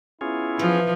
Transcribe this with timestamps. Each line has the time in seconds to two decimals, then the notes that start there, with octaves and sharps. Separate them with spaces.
0.21 B3 C#4 E4 F4 G#4
0.59 E3 F3